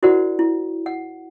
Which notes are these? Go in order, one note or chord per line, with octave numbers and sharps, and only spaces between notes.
E4 F#4 A#4 C5 D5 F#5
E4
F#5